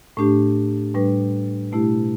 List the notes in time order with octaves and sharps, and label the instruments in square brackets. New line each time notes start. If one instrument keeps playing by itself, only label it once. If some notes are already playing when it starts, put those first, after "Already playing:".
[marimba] A2 A3 D4 G4
A2 G3 D4 B4
B2 A3 E4 G4